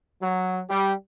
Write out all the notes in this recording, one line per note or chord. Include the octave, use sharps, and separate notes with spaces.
F#3
G3